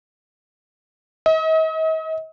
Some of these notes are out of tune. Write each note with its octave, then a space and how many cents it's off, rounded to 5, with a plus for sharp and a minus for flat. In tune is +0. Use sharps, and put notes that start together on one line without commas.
D#5 +40